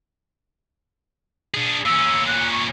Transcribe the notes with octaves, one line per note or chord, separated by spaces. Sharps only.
D4 G#4
A#2 C#4 E6
F#6
C#6